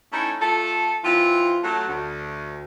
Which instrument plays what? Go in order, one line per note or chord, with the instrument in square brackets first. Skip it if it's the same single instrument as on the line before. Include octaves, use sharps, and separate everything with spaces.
[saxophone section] A3 C#4 D#4 E4
A3 F4 A4
E3 C4 F4
F#3 A3
D2